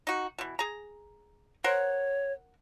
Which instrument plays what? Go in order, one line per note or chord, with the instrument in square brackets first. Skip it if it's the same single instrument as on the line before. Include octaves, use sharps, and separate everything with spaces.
[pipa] D#4 F#4
B2 E3
G#4 A#5
[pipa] A#4 C5 F#5 [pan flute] C#5